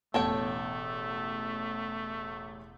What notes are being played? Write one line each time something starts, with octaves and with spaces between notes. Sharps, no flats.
E1 A1 E2 A3 B3 A4 C#5 G5